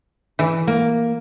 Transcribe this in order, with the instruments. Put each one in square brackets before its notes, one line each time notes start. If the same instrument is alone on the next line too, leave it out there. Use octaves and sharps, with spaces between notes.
[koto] E3
[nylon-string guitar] A#3